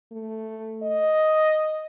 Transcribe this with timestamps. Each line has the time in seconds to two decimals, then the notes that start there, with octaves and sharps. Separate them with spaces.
0.12 A3
0.83 D#5